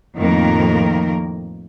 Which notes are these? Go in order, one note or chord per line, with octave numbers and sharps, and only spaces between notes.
F2 A2 D#3 A#3 A#4